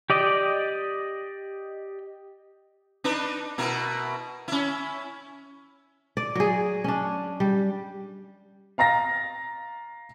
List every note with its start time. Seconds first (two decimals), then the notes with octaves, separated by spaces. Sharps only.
0.10 G4 D5 D#5
3.04 D4 D#4 B4
3.58 B2 E4 A#4
4.48 C#4 E4
6.17 D5
6.35 F#3 G#4
6.84 C#4 D4
7.40 G3
8.78 F5 A#5 A6 A#6